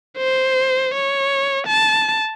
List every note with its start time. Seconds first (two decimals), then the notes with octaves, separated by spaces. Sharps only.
0.18 C5
0.94 C#5
1.67 A5